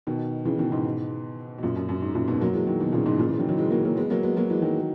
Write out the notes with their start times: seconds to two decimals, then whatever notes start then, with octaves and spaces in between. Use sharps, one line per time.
0.07 B2 D#3
0.45 C#3 E3
0.59 B2 D#3
0.72 G#2 B2
1.58 B2
1.63 F#2 A#2
1.76 F#2
1.89 F#2
2.02 G#2
2.15 F#2 A#2
2.28 G#2 B2
2.41 F#3 A#3
2.54 E3 G#3
2.67 D#3 F#3
2.80 B2 D#3
2.93 A#2 C#3
3.06 G#2 B2
3.19 A#2 C#3
3.29 C#3 E3
3.38 D#3 F#3
3.49 D#3 F#3
3.58 E3 G#3
3.71 F#3 A#3
3.85 F#3 A#3
3.97 G#3 B3
4.10 F#3 A#3
4.23 G#3 B3
4.37 F#3 A#3
4.50 E3 G#3
4.62 D#3 F#3